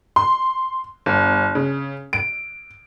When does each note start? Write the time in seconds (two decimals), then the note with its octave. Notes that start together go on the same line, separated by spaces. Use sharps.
0.16 C6
1.06 G1
1.55 C#3
2.13 D7